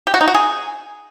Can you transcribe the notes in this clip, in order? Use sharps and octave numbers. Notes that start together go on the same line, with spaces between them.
G4
F#4
D#4
F#4
G#4